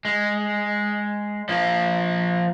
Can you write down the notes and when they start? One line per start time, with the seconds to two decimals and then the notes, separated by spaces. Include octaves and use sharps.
0.05 G#3
1.49 F3 A#3